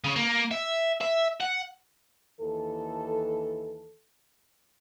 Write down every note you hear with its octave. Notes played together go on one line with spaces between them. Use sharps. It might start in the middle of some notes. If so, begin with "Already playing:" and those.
C#3
A#3
E5
E5
F#5
D#2 E3 A4